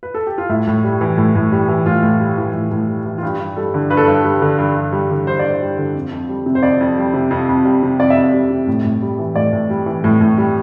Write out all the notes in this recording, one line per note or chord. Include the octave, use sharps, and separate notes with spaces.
B4
A4
G4
F4
A2 E4
A2
G3
E3
A2
A2
G3
E3
A2 F4
A2
G3
E3
A2
A2
G3
E3
F4
G2 G4
G2
G3 A4
D3
G2 B4
A4
G2 B4
G3
D3
G2
G2
G3
D3
G2 C5
G2 D5
C5
G3
D3
F2
F2
G3
C3
C5
F2 D5
F2
G3
C3
F2
F2
G3
C3
F2 D5
E5
F2
D5
G3
C3
A2
A2
G3
E3
A2 D5
A2
G3
E3
A2
A2
G3